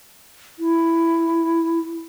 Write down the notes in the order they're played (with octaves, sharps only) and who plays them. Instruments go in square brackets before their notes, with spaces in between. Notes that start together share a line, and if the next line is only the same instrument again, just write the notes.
[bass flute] E4